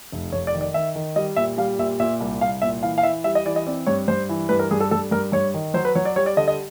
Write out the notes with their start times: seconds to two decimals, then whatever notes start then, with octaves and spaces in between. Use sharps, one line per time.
0.12 F1
0.32 F1 C#5
0.47 D5
0.54 D#3
0.61 D5
0.74 D#3 E5
0.95 D#3
1.16 G3 D#5
1.36 A#2 E5
1.58 G3 F5
1.79 A#2 E5
2.00 A#2 E5
2.20 C2
2.41 C2 F5
2.62 A#2 E5
2.83 E3 F5
2.98 F5
3.03 E3 E5
3.24 G3 E5
3.35 D#5
3.46 E3 D5
3.56 D#5
3.67 C4 D5
3.87 G2 C#5
4.08 G2 C5
4.29 E3
4.49 G2 B4
4.59 A#4
4.71 G2 G#4
4.80 A4
4.91 G2 A4
5.11 G2 A#4
5.32 G2 C#5
5.54 D#3
5.74 F#3 C5
5.85 B4
5.95 F#3 C#5
6.05 D5
6.16 G3 C#5
6.26 D5
6.37 D3 D#5
6.48 D#5